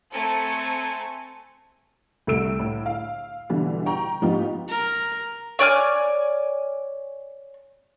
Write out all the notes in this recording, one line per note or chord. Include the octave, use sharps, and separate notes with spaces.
A3 C4 A4 G#5 A#5 C#7
C2 A3 E6 D7
A2
F5
B2 D3 E3 G3
G5 A#5 C#6
G#2 F3 B3 D#4 F4 G4
A#4
C#5 D5 G#5 F6